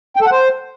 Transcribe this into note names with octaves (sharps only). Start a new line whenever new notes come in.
G5
A4
F#5
C5